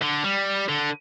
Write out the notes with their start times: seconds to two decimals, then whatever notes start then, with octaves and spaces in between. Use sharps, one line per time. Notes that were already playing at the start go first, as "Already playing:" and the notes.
0.02 D3
0.24 G3
0.69 D3